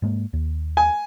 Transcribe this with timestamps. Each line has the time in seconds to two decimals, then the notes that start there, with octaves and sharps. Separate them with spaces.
0.02 G#2 G#3 A#3
0.33 D#2
0.77 G#5